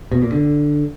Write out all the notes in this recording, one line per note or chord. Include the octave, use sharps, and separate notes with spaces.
B2
A#2
D3